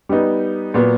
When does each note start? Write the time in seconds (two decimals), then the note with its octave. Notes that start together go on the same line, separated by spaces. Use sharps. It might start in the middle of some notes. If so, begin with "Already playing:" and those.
0.09 G3 B3 D#4
0.74 A#2 F#3 B3